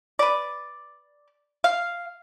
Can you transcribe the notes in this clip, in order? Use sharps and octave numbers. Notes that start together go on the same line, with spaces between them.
B4 D5
F5